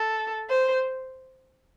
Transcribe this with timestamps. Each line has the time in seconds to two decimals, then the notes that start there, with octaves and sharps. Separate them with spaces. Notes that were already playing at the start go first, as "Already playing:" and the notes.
Already playing: A4
0.49 C5